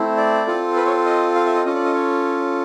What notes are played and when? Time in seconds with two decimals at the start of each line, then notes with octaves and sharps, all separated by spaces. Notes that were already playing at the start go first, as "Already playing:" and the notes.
Already playing: A3 C4 E4
0.17 D5
0.47 C4 F4 A4
0.76 B4
0.86 C#5
1.06 D#5
1.35 F5
1.46 E5
1.55 D#5
1.66 C#4 F4 A4 D#5
1.75 D5
1.85 D#5
1.95 C#5